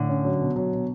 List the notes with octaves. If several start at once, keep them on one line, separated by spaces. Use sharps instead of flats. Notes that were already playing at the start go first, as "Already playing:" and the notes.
Already playing: A2 D3
C#4
F#3
B2
F#3
B2